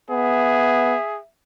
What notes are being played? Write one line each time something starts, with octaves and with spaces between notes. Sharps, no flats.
B3 G#4 E5